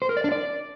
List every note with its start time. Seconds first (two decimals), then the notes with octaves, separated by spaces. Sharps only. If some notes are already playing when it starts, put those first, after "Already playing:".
0.02 C5
0.09 A#4
0.17 D5
0.24 D4
0.32 D5